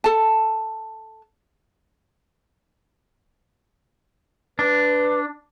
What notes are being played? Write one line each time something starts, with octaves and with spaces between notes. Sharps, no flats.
A4 A5
D4 B4